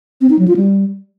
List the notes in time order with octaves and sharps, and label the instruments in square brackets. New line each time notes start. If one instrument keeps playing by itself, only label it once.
[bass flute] C4
D#4
F#3
F4
G3